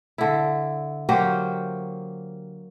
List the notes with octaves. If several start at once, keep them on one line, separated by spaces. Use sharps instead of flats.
D3 E4
F#3 A#3 G4 C5